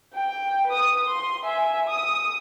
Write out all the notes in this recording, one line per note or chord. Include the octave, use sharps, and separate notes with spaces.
G5
B4 D#6
C6
E5 G#5
D#6